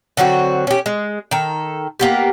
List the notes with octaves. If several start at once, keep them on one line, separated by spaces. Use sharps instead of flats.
D3 F#3 C4 F#4
C#4 G4
G#3
D#3 A4
A#3 B3 G4